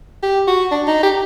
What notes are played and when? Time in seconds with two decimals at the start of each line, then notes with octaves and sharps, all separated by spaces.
0.23 G4
0.48 F#4
0.71 D4
0.87 D#4
1.03 G4